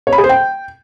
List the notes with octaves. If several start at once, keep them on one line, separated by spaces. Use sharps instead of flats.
C#5
B5
G#4
C5
G5